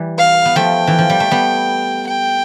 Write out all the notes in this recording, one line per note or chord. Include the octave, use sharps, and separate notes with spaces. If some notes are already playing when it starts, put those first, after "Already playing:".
Already playing: E3 G3
F5
B3
F3 A3 G5
E3
F3
G3
A3
G3 B3
G5